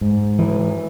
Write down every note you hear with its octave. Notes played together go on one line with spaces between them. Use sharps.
G#2
E3